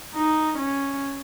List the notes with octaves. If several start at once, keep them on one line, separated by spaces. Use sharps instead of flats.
D#4
C#4